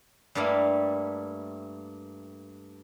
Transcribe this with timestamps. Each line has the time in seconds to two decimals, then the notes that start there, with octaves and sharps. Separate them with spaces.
0.35 G2 G3 A3 A#3 E4